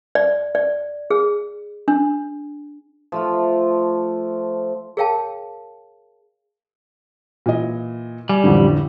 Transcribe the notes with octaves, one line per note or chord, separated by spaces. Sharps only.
D5
D5
G#4
D4
F3 A3 F4
G#4 A#4 C#5 F5 G5 A5
A#2 E3 D#5
G3 G#5
A1 F2 D3